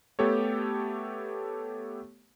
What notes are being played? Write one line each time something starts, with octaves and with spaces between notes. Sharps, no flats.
A3 B3 G4 A4 C#5